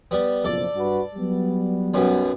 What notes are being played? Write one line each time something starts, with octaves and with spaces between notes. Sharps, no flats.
G3 B3
F#1 B2 F3 A4 D5
G2 F#4 B4
F#3 G3 B3
B1 F#2 B2